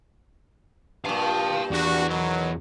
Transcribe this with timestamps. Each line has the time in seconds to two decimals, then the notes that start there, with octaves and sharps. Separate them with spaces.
1.05 G2 A#2 F5 A5
1.71 E2 D4 F#4
2.09 B2 D#3 F#3